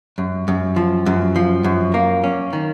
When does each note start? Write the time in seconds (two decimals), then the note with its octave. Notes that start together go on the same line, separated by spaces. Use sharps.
0.18 F#2
0.48 F#2
0.76 F3
1.06 F#2
1.36 F3
1.64 F#2
1.94 A#3
2.24 C#4
2.53 D#3